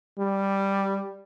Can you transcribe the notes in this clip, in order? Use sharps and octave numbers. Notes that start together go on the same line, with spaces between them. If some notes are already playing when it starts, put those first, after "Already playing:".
G3